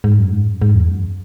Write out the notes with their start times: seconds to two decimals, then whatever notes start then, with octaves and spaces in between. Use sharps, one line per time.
0.04 G#2
0.19 F#2
0.32 G#2
0.47 F#2
0.62 G#2
0.75 E2
0.90 F#2